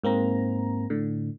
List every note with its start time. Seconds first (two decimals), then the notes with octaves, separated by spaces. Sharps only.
0.04 G#2 A#3 C4 A#5
0.90 A2 D3